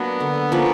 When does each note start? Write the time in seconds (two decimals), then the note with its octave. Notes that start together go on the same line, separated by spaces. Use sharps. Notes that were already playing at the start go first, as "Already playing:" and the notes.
Already playing: F#3 A#3 B3 D4
0.20 D3
0.52 F3 A#3 C#4